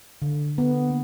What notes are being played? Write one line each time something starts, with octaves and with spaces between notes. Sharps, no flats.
D3
B3
A#3